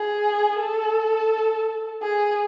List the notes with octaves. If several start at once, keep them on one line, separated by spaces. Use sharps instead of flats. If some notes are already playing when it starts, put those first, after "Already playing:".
Already playing: G#4
A4
G#4